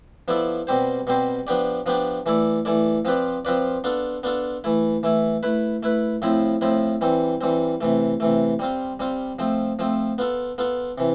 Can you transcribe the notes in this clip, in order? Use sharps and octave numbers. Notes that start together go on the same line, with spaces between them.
F3 B3 E4 A4 D5
B2 G3 C4 G4 C5
B2 G3 C4 G4 C5
F3 B3 D4 G4 D5
F3 B3 D4 G4 D5
E3 A3 E4 A4 D5
E3 A3 E4 A4 D5
F3 C4 F4 B4 D5
F3 C4 F4 B4 D5
B3 D4 F4 A4
B3 D4 F4 A4
E3 A3 E4
E3 A3 E4
A3 E4 B4
A3 E4 B4
A2 F3 C4 E4
A2 F3 C4 E4
E3 G3 C4
E3 G3 C4
C3 E3 A3
C3 E3 A3
G3 C4 F4
G3 C4 F4
F3 A3 C4
F3 A3 C4
B3 F4 A4
B3 F4 A4
C3 E3